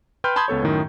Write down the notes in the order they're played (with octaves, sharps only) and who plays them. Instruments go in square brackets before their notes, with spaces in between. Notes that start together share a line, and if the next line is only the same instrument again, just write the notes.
[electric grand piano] B4 G5 C6 F6 G6
A5 B5 C6 D#6 G6 G#6
C#2 B3 A4 C#5
F#2 A2 D#3